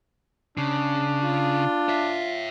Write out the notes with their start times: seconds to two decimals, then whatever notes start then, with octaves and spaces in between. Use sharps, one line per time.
0.57 C#3 D4
1.21 F4
1.89 C#5 E5